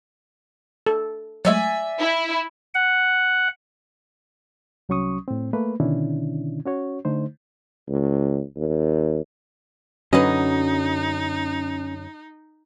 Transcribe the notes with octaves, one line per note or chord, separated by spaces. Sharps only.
A4
F#3 G#3 A3 D5 E5 G#5
E4
F#5
C2 F#3 C#4 C#6 D#6
A2 C4
A3 A#3 B4
B2 D3 D#3 C#4 D4 E4
C#4 F#4 C#5
D3 A3 D#4 C5
C#2
D#2
F#2 D3 F#3 C#4 D#4 B4 D#5